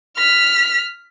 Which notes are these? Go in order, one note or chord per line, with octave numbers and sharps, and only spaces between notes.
F6 B6